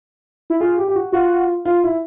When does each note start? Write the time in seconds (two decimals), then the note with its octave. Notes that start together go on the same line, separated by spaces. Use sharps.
0.50 E4
0.61 F4 G#4
0.78 G4
0.88 G4
0.95 F#4
1.12 F4 F#4
1.65 F4
1.84 E4